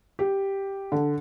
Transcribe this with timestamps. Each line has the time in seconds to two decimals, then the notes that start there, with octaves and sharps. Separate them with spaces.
0.19 G4
0.92 D3